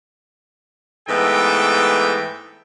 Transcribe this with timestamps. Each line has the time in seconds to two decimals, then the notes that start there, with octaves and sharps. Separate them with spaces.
1.08 G#2 E3 A3 B3 A4 G5